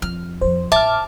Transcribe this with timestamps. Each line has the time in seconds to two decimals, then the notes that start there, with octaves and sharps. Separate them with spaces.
0.02 F2 F6
0.41 F2 F3 C5
0.72 A1 E5 A5 D6 F6